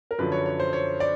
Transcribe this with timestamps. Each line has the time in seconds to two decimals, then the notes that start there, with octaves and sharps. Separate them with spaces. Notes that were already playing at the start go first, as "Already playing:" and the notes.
0.11 A#4
0.18 F#2 D3 F3 B4
0.32 C#5
0.46 C#5
0.60 C5
0.73 C#5
1.00 D5